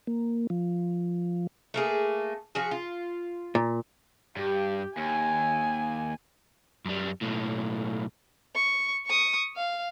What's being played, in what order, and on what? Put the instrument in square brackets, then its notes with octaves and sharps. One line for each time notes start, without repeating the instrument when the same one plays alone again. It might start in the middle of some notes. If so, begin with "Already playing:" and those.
[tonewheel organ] A#3
F3
[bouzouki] A3 A#3 G#4
F3 F#4 G#4
F4
[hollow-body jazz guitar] A#2
[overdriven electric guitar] G2 [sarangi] G4
[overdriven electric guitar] D#2 [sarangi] G#5
[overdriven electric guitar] F#2 G3
B1 A2
[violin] C#6
C#6 D#6
F5